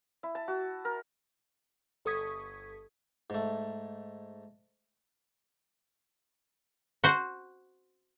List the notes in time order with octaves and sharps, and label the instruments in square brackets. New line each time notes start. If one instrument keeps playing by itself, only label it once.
[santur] E4
A5
F#4
A#4
[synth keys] G1 A4 C#6 D#6 G#6 B6
[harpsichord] G#2 A3
[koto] F#4 C5